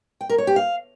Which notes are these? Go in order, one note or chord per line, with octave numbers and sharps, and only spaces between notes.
G5
A#4
C#5
G4
F5